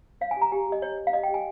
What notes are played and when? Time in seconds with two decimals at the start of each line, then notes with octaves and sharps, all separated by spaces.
0.21 C#5 F5
0.31 G#5
0.37 G4 A#5
0.52 G4 G#5
0.67 G4
0.72 D#5
0.82 C#5
0.98 C#5
1.07 F5
1.13 G4 D#5
1.23 G5
1.28 G4
1.34 G#5